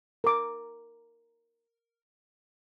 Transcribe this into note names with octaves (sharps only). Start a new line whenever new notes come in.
A#4 D6